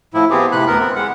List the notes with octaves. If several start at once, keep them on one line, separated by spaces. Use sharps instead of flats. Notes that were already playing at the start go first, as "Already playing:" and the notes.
A2 F3 E4
F3 B3 C4 G4 G#4
A2 C3 B5 F#6
D2 B3 A#4
C4
G#3 F#5